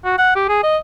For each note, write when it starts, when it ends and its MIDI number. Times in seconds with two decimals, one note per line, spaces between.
0.05 0.17 66
0.18 0.33 78
0.35 0.45 67
0.49 0.62 68
0.63 0.77 75